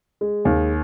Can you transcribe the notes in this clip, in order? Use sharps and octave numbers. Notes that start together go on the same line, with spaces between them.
G#3
D#2